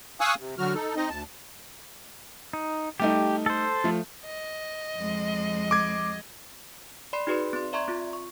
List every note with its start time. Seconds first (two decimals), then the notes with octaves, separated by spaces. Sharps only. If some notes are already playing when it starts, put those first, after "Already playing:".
0.20 F5 G#5 C#6 D#6 E6 F#6
0.40 C3
0.58 D3 F#3 F#4 F6
0.74 D#4 A4
0.96 C4 D#4 D#5
1.09 D2 A5
2.53 D#4
3.00 G3 A3 D#4 G4
3.46 A4 C5
3.84 F3 A3
4.25 D#5
4.97 F2 G#3
5.71 D6 G#6
7.13 D5 B5 C6 C7
7.27 D#4 F#4 G#4 B4 D5 C6
7.53 C4 C6
7.73 D5 E5 A#5 C6 C#6 G#6
7.88 C4 F4
8.13 C#6